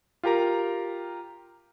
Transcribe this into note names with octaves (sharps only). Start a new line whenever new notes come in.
F4 G4 A#4 A#5